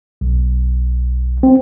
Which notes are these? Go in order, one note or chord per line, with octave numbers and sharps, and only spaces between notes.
B1
C4